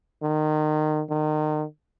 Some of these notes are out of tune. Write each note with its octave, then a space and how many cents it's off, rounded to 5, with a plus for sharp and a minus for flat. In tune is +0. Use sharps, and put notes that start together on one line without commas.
D#3 -25
D#3 -30